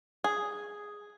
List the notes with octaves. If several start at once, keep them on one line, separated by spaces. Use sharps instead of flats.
G#4